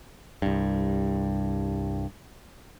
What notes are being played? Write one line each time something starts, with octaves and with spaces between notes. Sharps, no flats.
C2 G2